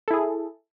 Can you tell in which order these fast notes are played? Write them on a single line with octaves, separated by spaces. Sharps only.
A4 E4 G#4